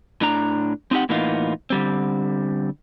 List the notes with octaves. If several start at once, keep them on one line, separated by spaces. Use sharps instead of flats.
A2 D4 A#5
C4 D#4 G4 F#5
A2 E3 A#3 B3 D#4 F4
D3 G3 C4